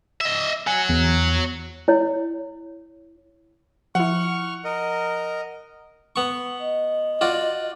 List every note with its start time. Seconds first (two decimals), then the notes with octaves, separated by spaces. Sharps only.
0.21 D#5 E5
0.67 C#5 F#5 G#5
0.89 E2
1.88 E4 C#5
3.95 F3 E4 F#5 C#6 F6
4.64 A#4 D#5
6.16 B3 C#6
6.60 D#5
7.21 F4 F#4 D5